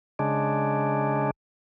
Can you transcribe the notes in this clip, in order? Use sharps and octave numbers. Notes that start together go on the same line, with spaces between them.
C#3 G#3 D4